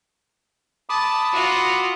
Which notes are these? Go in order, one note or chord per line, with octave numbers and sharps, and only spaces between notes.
A5 B5 D6 D#6
F4 F#4